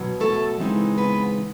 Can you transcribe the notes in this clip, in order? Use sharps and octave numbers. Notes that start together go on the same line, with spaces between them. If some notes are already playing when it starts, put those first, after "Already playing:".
Already playing: B2 F#3
A3 A4
C#3 E3 G#3 C4 D#4
B3 B4